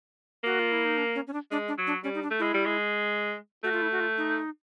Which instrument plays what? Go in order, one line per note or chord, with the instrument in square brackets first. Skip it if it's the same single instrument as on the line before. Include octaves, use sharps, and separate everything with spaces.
[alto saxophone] A#3 [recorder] F#4
[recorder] F4
E4
D#4
D4
C#4
C#4
D4
[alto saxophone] G#3 [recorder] D4
[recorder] D4
[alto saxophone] F#3
[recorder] D4
[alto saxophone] G3 [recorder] C#4
[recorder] D#4
D4
[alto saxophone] A3
[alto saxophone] G#3 [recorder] E4
[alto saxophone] G3
G#3
[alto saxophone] A3 [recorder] F#4
[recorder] F4
E4
F#4
F4
D#4